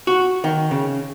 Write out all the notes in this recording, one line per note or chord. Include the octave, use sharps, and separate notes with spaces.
F#4
D#3
C#3